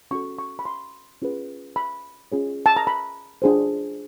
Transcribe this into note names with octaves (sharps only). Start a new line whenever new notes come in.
C#4 F#4 A4 C#6
C#6
B5
C6
C#4 F4 G#4 B4
B5
C#4 F4 G#4 C#5
A5
A#5
B5
D4 F4 G#4 C5